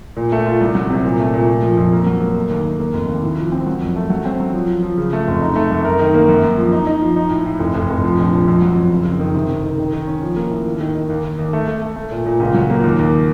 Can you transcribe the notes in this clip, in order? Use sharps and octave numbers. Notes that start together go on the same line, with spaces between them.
A#2
A3
F4
C2
F#3
C3
A#2
A3
A#2
A3
F3
F2
A#3
F#3
A#3
A3
D#2
D#2
A#3
F1
D#2
A2
F3
C4
F#3
F2
A3
F#3
C4
F#3
F3
F3
F3
C#3
A3
F1
D#4
A3
F#2
A#4
D#3
A#3
F#2
F#2
F3
D#4
D#4
F3
D#4
A2
A2
F1
F1
F1
F3
A#1
F3
F2
F#3
F2
F#1
F#1
D#3
C3
C3
D#3
D#3
D#3
C#4
F3
A#3
A2
D#2
D#3
D#3
D#2
D#2
D#2
A3
A3
A3
A3
A#2
A#2
C#2
F#3
A#3
D#2
D#2